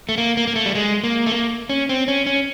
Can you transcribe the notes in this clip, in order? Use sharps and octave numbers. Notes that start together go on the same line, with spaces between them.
A3
A#3
A#3
A#3
A3
G3
G#3
A#3
A3
A#3
C#4
C4
C#4
C#4